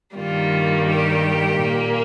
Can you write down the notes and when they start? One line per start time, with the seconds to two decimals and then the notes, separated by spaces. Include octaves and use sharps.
0.16 G2 D#3 G3 A#3 F4
0.87 G4
1.59 A#2 A#3